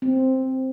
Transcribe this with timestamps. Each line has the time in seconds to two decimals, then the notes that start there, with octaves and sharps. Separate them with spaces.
0.02 C4